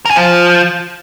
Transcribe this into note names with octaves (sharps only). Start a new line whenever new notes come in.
A#4
G#4
F3